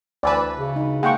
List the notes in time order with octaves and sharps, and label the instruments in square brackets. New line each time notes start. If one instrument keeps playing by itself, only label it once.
[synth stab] D2 E3 B4 [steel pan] D5 A5
[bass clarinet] C#3
[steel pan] D#4
[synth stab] G#3 [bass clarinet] A#3 [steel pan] F#5 G5 C#6